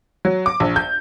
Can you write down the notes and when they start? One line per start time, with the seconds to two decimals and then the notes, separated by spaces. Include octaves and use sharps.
0.25 F#3
0.46 D6
0.60 A#1
0.76 G6